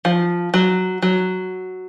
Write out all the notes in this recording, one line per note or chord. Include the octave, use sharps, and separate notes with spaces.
F3
F#3
F#3